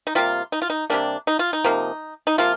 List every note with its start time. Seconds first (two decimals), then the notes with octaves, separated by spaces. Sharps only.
0.07 D#4
0.15 C3 G3 A#3 F4
0.52 D#4
0.62 F4
0.70 D#4
0.90 C3 G3 A#3 D4
1.27 D#4
1.39 F4
1.53 D#4
1.64 C3 F3 A#3
2.27 D#4
2.38 C3 F3 A#3 F4